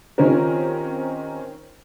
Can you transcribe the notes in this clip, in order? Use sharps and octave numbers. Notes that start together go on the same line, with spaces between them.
D#3 C4 C#4 F4 G4 A#4